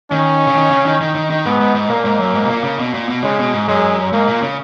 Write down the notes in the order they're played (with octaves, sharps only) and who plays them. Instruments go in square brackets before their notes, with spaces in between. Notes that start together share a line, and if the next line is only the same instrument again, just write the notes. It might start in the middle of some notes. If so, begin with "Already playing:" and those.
[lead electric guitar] D#3 [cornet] C#4
[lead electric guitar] C#3
D#3
C#3
D#3
D#3
D#3
D#3
[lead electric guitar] G#2 [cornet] B3
[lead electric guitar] G#2
G#2
[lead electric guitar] A#2 [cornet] A#3
[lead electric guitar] G#2
F#2
G#2
B2
A#2
C#3
B2
A#2
B2
[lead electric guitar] C#3 [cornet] G#3
[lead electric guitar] B2
G#2
[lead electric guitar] F#2 [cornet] G#3
[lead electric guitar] G#2 [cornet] A#3
[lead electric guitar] A#2
C#3